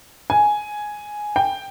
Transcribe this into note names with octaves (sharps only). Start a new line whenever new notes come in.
G#5
G5